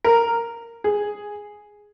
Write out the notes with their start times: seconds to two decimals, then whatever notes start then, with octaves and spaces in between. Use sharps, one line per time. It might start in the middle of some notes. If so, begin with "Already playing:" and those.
0.04 A#4
0.84 G#4